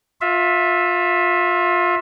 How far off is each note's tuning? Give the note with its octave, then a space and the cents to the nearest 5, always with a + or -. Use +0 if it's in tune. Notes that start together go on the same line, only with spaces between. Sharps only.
F4 +25 E5 +0